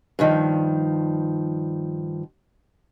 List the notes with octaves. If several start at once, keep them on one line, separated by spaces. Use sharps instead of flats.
G2 D3 D#3 F3